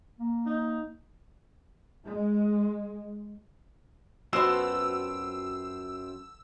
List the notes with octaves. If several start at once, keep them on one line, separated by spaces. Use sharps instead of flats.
A#3
D#4
G#3
F#2 A3 B3 C4 F4 F#4 C5 E6